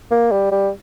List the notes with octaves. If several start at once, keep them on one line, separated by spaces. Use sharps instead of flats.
A#3
G3
G3